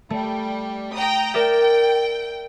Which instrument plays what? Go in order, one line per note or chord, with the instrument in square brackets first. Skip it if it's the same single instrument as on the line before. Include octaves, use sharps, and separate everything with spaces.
[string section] G3 [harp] A3
[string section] G5 A#5 D#6
[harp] A#4 D5 E5 [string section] G5